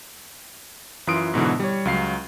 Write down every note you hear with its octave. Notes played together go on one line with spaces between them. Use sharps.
F#2 E3 F4 C6 D#6 D7
G#2 B2 D3 E3
G3 C#5
C#2 F#3 F5 C7